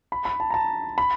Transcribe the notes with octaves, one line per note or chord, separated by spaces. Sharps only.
B5
B5
A5
A#5
A5
B5